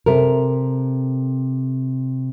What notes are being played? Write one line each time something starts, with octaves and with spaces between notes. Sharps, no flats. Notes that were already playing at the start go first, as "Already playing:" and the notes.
C3 A4 A#4